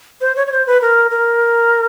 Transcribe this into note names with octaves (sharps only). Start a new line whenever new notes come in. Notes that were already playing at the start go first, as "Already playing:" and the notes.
C5
C#5
C#5
C5
B4
A#4
A#4